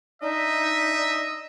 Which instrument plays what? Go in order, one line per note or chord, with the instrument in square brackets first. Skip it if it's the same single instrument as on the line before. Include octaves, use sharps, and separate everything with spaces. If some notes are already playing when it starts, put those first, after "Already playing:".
[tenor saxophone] D4 [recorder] D#4 [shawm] D#5 [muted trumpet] E5